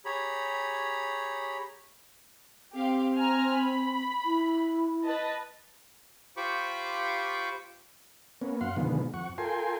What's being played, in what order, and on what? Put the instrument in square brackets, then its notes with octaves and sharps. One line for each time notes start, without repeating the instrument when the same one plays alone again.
[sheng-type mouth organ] G4 G#4 C#5 A#5 B5
[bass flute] C4 [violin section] G4 F5
[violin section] G#5 A#5 F6
B5
[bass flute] E4
[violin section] B4 D#5 A5
[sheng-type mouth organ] F4 G4 C5 B5 C#6 D6
[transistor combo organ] A#3 B3 C#4
F#2 F5 F#5 C6
B2 D3 D#3 F3 G#3 B3
F2 F#5 C#6
F4 A4 A#4 G5 G#5 C6